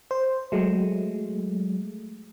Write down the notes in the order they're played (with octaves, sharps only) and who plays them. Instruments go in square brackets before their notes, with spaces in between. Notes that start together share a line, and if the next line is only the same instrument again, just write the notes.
[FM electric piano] C5
F#3 G#3 A3